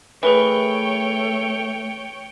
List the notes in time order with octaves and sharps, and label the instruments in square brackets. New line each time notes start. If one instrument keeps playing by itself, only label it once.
[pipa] E3 [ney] A3 [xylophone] G#4 A#4 B4 [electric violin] C#5 G5